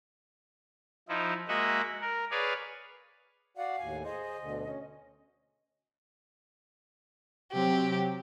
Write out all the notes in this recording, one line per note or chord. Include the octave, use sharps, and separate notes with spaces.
F3 D#4 E4
G#3 A#3 F#4 D#5 E5 F#5
A#4
G#4 B4 C#5 D5 F5
F#4 D5 F5 F#5
D#2 A2 G#5
G#4 C5 D#5
D2 B2 D3
C#4
C3 F#3 C4 G4